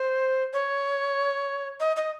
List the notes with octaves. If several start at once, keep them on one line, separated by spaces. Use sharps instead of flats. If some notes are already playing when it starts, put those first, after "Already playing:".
Already playing: C5
C#5
D#5
D#5